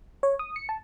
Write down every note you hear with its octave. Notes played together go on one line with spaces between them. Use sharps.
C#5
D#6
C#7
A5